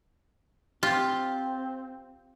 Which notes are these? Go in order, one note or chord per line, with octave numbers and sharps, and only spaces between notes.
C4 F4 G4